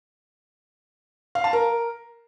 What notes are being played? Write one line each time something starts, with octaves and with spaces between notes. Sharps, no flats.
F5
A5
A#4